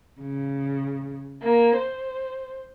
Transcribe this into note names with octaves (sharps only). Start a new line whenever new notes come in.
C#3
A#3
C5